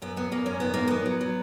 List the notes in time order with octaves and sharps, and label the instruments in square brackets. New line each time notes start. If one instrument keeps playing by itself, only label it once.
[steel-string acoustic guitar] F#2 B3
F#3 B3
F#2 A#3
F#2 C#4
D#3 B3
F#2 A#3
D#3 B3
F#3
F#3